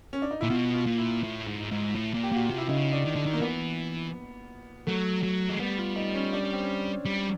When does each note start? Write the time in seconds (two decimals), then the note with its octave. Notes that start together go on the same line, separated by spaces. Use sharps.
0.13 C#4
0.22 D4
0.31 D#4
0.41 A#2 E4
0.50 B2 F4
0.74 F4
0.87 A#2
0.98 E4
1.23 A2
1.47 G#2
1.71 G#2
1.95 A2
2.14 A#2
2.23 G4
2.32 A#2 F#4
2.46 C3 F4
2.58 E4
2.69 C#3 D#4
2.92 D4
3.05 D#3
3.16 D3
3.26 D#3
3.33 A#3
3.41 E3 B3
4.87 F#3 A3
5.23 F#3
5.49 G#3
5.60 G3 B3
5.78 F4
5.96 D#4
6.14 C#4
6.33 D4
6.42 C#4
6.53 C4
6.63 C#4
7.05 G3